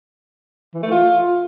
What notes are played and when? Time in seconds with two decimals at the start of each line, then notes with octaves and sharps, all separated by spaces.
0.74 E3
0.83 A3
0.91 F4